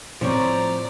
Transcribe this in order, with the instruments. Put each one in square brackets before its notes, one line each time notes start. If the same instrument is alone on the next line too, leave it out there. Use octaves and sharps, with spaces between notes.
[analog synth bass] A2 [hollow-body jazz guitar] F3 C4 C#5 [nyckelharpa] D5 A#5